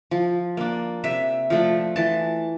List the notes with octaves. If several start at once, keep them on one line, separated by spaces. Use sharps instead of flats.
F3
A#3 D4
C3 E5
F3 A3 D4
E3 A5